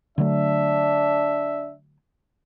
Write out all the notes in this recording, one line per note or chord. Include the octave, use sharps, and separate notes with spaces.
D3 F#3 A3 D4 E5